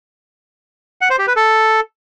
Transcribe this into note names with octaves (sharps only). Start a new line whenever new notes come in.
F#5
C5
G4
B4
A4